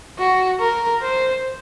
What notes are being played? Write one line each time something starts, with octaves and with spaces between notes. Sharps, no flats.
F#4
A#4
C5